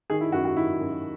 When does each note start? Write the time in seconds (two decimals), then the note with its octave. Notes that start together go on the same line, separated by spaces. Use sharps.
0.10 D#3 G#4
0.21 E4
0.32 F#2 F#4
0.45 F#4
0.56 D#3 E4
0.80 F#2